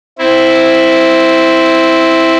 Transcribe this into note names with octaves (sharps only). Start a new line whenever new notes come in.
C4 E4